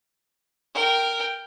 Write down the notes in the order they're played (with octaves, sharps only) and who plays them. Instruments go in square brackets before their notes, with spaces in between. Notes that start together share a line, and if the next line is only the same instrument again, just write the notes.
[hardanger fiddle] A#4 G5